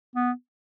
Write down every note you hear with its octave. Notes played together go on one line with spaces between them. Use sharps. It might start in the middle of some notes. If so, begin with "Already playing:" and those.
B3